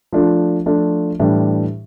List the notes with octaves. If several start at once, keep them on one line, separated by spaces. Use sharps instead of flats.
F3 A3 D4 F4
F3 A3 D4 F4
A2 E3 G3 D4